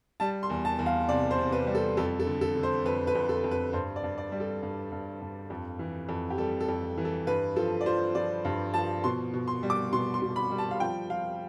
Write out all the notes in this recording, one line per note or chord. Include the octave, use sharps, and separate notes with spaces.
G3 A5
C6
E2
A5
E2
F5
C3 D5
C5
C3
B4
G3
A4
F2 A4
A4
D3
A4
D3
C5
F2 B4
B4
F2
A4
F2
B4
G2 C5
D5
G2
D5
G3
A4
G2
G2
G2
F2
E3
F2
G4
G3 A4
A4
F2
E3
A4
G2 B4
F3 A4
D5
F3 C5
F3 D5
G2
F3 A5
B2 C6
B2
C6
G3
D6
B2 C6
C6
B2
B5
G3
A5
F5
F3 G5
F3 F5